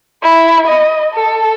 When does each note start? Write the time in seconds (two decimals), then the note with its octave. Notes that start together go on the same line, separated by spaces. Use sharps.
0.23 E4
0.68 D#5
1.15 A4